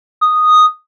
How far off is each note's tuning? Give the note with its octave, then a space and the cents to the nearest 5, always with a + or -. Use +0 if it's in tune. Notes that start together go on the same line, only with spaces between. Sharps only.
D#6 -5